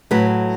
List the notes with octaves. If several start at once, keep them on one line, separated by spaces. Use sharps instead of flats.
A2 F#3 B4